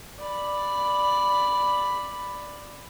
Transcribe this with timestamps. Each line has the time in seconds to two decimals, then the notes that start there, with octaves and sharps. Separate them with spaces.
0.20 D5 B5